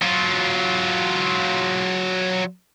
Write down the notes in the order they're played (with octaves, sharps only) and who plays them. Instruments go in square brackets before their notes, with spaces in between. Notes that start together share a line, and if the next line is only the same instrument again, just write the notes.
[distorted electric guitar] F#3 F4